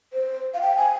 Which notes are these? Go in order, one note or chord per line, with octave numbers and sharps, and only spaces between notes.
C5
F5
G5
G#5